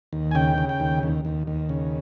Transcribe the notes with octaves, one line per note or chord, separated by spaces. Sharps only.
D#2
G#5
C#3 G5
C#3
G5
D#2
D#2
D#2
D#2
C#3